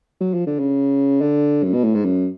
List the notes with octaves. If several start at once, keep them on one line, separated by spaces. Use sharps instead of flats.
F#3
F3
D3
C#3
D3
F#2
B2
A2
G#2
F#2